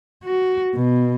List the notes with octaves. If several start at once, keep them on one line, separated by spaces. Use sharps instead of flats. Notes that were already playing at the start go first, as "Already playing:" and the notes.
F#4
B2